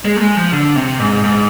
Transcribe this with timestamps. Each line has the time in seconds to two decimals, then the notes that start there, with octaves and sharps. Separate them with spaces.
0.05 G#3
0.17 A3
0.21 G#3
0.37 F3
0.52 D3
0.76 C3
0.99 G#2
1.24 G#2